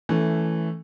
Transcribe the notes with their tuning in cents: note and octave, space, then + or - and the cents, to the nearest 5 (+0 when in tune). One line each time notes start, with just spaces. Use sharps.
E3 +0 A3 +5 C#4 +15